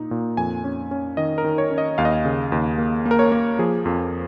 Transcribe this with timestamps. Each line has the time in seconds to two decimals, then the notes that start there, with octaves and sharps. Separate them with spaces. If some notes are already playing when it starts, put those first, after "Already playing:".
Already playing: A#2 D#4
0.11 A#2
0.37 F2 G#5
0.64 C#4
0.91 C#4
1.17 D#3 D#5
1.38 A#4
1.44 D#3
1.58 C#5
1.71 C#4
1.78 D#5
1.98 D#2 F5
2.05 D#5
2.12 F5
2.25 C#3
2.52 D#2
2.78 A#3
3.06 A#3
3.11 A#4
3.19 C#5
3.32 A#3
3.59 F3 G#4
3.85 F2